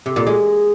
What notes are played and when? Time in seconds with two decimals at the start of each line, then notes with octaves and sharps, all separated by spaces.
0.06 C3
0.16 A#2
0.27 G#3